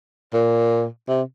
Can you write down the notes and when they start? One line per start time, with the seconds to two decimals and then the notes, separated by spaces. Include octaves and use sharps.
0.33 A#2
1.08 C3